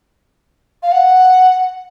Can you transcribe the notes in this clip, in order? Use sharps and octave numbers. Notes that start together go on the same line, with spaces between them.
F5
F#5